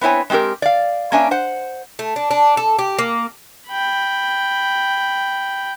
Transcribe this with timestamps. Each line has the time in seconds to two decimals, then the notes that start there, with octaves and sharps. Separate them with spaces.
0.01 B3 C4 E4 C#5 G#5
0.30 G#3 C4 F#4 G4 A#4
0.62 D5 F5
1.12 A#3 C#4 D4 E5 G#5
1.31 C5 F#5
1.99 A3
2.16 D4
2.31 D4
2.57 A4
2.79 G4
2.99 A#3
3.68 G5 B5